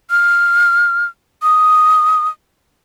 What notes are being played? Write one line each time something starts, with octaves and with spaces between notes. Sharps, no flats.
F6
D#6